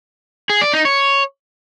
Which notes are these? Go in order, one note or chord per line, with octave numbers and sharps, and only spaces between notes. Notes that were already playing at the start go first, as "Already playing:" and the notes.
G#4
D5
D#4
C#5